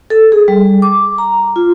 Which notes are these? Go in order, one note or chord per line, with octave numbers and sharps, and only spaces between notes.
A4
G#4
G3
D6
A#5
F4